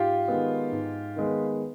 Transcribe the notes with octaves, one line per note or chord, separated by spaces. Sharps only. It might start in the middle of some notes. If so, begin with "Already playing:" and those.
Already playing: G#2 F4 G4
D#3 G#3 B3
G#2
D#3 G#3 B3